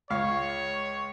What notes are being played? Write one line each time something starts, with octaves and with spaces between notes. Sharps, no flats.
C#2 C#5 F5